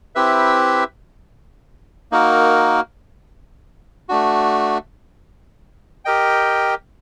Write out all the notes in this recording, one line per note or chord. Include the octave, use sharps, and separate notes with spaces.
C4 E4 G4 B4 E5
A#3 D#4 F#4 A#4
A3 D4 F#4
G4 A#4 D#5 G5